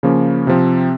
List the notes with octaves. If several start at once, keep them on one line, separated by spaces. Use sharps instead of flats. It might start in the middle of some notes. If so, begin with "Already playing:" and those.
C#3 F3 A#3 C#4
C3 F3 C4